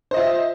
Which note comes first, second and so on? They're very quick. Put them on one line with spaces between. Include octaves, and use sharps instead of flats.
C5 D#5 F4 E5